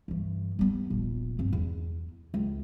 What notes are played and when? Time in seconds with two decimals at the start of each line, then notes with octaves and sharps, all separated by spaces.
0.08 G2 E3
0.59 G3 B3
0.90 D#1 A#1
1.39 G2 C4
1.53 E2
2.34 C#2